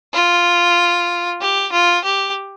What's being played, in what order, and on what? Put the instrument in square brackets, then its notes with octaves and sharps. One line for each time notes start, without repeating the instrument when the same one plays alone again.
[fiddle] F4
G4
F4
G4